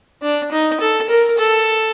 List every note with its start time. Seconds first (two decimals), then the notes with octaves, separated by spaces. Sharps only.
0.22 D4
0.52 D#4
0.80 A4
1.09 A#4
1.38 A4